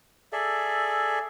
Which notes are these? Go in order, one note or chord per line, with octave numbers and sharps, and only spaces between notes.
G#4 A4 D5 E5